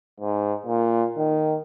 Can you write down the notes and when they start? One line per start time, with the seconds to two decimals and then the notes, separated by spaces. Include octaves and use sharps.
0.20 G#2
0.66 A#2
1.18 D#3